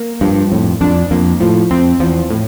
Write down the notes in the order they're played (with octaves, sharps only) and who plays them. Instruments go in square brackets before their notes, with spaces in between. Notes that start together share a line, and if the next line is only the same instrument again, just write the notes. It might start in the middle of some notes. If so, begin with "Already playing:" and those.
Already playing: [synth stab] A#3
[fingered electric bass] G2 [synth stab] F3
[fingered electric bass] F2 [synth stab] A2
[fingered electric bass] F2 [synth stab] D4
[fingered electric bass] F2 [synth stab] A#3
[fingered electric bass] A2 [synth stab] F3
[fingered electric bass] F2 [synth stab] C4
[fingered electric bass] E2 [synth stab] F3
[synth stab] A2